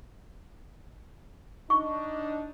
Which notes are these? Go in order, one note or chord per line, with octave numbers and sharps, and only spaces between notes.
D4 D#4 C#6